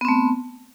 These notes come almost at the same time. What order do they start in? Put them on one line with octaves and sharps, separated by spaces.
B3 C4 A3